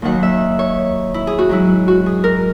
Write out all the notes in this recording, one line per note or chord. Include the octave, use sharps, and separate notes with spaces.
D#2 D#3 F#3 F#5
E5
C#5
E4
G#4
F#4
G#2 F#3 E4
F#4
G#4
A#4